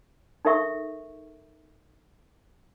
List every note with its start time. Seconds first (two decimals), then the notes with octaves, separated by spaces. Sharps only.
0.45 D#4 A4 A#4 E5 C#6